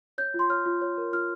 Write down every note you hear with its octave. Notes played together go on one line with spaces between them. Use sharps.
C#5 G6
F4
C6
C#5 F6
F4
C#5
A#4
F4 F6